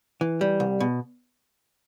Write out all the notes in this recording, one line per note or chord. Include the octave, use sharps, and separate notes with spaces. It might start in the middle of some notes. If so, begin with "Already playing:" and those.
E3
G3
C2
B2